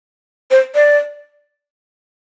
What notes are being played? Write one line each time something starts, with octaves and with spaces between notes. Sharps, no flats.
C5
D5